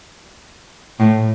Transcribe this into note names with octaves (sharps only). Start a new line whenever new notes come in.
A2